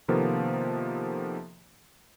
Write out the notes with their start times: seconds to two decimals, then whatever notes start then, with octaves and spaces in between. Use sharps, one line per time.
0.08 C3 D#3 F3 A#3 B3 A4